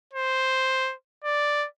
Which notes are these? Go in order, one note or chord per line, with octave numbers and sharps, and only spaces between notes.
C5
D5